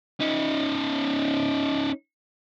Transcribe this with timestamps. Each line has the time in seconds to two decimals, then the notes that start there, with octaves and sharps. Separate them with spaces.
0.20 C#4 D#4